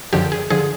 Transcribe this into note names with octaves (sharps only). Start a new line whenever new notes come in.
F#2 D3 F3 G4
G#4
D3 F3 G#4